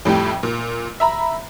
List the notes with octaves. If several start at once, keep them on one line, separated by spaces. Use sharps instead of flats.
F2 A2 G3 G5
A#2
E5 A#5 B5